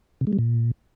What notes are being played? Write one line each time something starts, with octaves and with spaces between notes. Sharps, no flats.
C3
G#3
G3
A#2